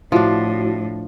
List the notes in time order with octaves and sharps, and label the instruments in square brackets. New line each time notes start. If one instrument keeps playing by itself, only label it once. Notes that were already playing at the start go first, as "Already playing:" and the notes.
[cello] A2 [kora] F3 D4 [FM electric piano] E4 F#4